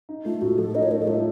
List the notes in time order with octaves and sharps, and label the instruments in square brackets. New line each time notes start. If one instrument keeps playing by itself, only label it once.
[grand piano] D#4
[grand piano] A3 [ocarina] F4
[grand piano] A2 [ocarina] F#4
[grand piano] F3 [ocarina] A4
[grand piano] D#4 [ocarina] D#5
[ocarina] C#5
[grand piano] A2 [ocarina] A#4
[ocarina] A4
[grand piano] A3 [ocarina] F4